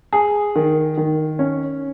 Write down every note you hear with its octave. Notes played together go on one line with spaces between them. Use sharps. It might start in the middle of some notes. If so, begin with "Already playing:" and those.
G#4
D#3
D#3
C#4